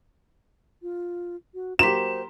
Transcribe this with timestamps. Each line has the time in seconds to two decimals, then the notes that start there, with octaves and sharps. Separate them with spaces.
0.82 F4
1.54 F#4
1.79 F#3 A#3 G4 C5 A#5 C6 B6 E7